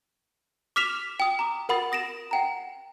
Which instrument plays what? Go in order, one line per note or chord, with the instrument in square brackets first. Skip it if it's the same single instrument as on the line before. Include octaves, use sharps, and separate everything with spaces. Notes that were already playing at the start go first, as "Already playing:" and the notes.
[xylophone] D6 F6 B6 E7 F7
G5 D#6
A#5 D6
A#4 F#5 B5 D#6 A6
D#6 A#6 D7 E7
F#5 G5 A#5